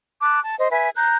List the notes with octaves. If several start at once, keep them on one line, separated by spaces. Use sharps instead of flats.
A5 D6 F#6
A5
C5 D#5
B4 E5 G#5
A#5 F#6 G6